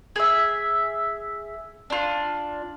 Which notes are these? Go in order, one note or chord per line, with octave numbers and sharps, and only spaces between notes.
G#4 E5
D4 F4